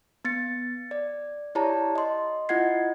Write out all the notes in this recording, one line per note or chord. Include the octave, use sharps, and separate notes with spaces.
B3 A6 C#7
D5
E4 G4 C#5 D5 A5 A#5
D#5 C6
E4 F4 D#5 F#5 G#6 C7